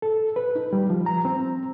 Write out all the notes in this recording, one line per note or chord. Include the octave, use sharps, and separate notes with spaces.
A4
B4
D#4
G3
F3
A#5
C4